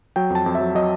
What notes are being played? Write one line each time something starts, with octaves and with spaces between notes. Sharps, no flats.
F#3 G5
F2 A5
F2
E5
F#3
F#3 D#5